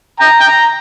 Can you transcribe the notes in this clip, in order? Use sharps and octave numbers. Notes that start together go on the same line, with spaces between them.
G5 A#5
G5
A#5